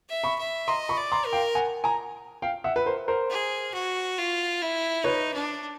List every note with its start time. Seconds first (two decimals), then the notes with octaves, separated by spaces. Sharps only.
0.09 E5
0.24 B5 C#6
0.39 E5
0.67 D#5 A#5 C6
0.89 B5 C#6
0.97 D5
1.12 A#5 C6
1.26 A#4
1.33 F5 G5
1.55 F#5 G#5
1.84 G#5 A#5
2.42 F5 G5
2.64 E5 F#5
2.76 B4
2.86 A#4 C5
3.08 A#4 C5
3.30 G#4
3.74 F#4
4.18 F4
4.61 E4
5.04 D#4 B4 C#5
5.34 D4